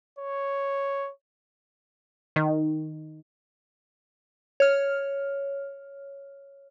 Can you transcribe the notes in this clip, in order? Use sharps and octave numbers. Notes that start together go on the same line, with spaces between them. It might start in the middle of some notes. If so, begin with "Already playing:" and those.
C#5
D#3
C#5 F6